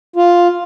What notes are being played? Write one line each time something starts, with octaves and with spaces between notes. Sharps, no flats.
F4